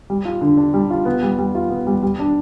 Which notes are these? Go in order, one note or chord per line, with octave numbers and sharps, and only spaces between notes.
G3
F4
D3
D4
G3
F4
B3
G3
G3
F4
B3
G3
G3
D4